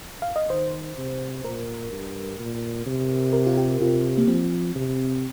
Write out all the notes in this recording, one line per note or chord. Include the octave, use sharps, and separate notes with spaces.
F5
D#5
D#3 C5
C3
A#2 A#4
G2
A#2
C3
A#4
F4
G4
C3 F4
A#3
F3 C4
C3